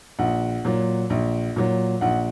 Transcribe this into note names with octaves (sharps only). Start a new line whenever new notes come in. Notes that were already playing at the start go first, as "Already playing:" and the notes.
A#1 F#5
A#2 F#3
A#1
A#2 F#3
A#1 F#5